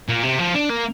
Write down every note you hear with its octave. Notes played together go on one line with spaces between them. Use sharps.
A#2
C3
F3
D4
A#3